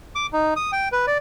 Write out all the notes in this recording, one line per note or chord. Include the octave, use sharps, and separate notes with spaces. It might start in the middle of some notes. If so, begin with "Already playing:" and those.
D6
D#4
D#6
G5
B4
D5